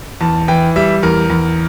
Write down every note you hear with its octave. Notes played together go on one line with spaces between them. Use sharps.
E2 A5
E3 G5
G3 E5
E2 A#4
E2